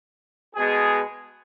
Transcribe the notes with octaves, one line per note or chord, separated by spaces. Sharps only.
B2 G#3 B3 G#4